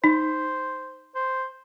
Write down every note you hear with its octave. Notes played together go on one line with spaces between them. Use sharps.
D#4 C5
C5